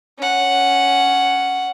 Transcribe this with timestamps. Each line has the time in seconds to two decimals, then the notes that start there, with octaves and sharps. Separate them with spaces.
0.18 C#4 F#5